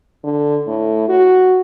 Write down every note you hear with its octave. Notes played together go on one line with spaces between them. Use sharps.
D3
A2
F#4